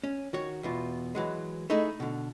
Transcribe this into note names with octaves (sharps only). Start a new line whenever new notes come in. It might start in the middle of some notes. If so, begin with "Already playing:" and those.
C#4
D#3 F#4 C#5
E2 B2 F4
E3 F#3 G#3
A3 D#4 E4 G#4
B2 D3